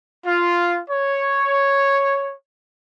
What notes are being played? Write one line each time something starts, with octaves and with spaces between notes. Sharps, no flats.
F4
C#5